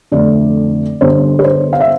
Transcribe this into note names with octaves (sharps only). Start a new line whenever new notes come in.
F2 D3 A3 C4 D5
G1 G2 D3 C5
B4
C5
F5
E5